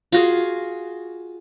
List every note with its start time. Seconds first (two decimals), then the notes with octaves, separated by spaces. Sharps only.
0.12 F4 F#4 G#4